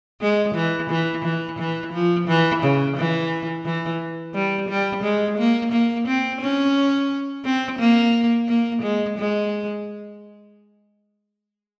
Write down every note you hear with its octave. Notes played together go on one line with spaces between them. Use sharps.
G#3
E3
E3
E3
E3
F3
E3
C#3
E3
E3
G3
G3
G#3
A#3
A#3
C4
C#4
C4
A#3
A#3
G#3
G#3